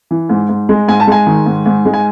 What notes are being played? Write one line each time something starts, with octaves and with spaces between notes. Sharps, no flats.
E3
G#2
G#2
G#3
G#2 G#5
A5
G#3 G#5
D#3
G#2
G#2
G#3
G#5